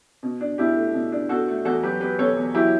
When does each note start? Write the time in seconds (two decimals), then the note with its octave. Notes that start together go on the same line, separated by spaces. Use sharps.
0.23 B2
0.41 D4
0.58 B2 E4 G4
0.76 A3
0.94 B2
1.12 D4
1.29 B2 F#4 A4
1.48 A3
1.65 E2 F#4 A4
1.83 F#3 G4 B4
2.00 B3 G4 B4
2.19 B2 A4 C#5
2.36 E2
2.54 F#3 E4 G4